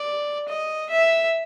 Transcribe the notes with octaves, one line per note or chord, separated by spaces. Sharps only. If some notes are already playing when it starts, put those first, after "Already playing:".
Already playing: D5
D#5
E5